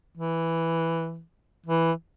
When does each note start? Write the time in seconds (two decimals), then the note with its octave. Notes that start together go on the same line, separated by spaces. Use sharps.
0.17 E3
1.66 E3